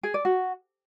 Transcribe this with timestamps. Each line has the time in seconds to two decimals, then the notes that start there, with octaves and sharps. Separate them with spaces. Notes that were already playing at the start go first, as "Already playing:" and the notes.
0.03 G#4
0.14 D5
0.25 F#4